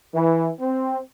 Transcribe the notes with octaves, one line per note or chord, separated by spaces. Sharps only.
E3
C4